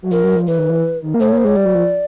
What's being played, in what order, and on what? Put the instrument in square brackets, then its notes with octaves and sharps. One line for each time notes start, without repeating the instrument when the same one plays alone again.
[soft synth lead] F#3
[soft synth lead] F3 [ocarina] A#4
[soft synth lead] F#3
F3
[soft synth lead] E3 [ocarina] B4
[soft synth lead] D#3
E3
D#3
A#3
[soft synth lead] A3 [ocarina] C5
[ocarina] C#5
[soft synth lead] A#3
[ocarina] C5
[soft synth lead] G#3 [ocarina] C#5
[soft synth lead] G3 [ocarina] D5
[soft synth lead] F#3
F3